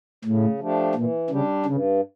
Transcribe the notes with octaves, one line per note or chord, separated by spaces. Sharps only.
A2 C#3
F3 A3 D4 G4
A#2 E3
C#3 G3 D4 G4
G2 C#3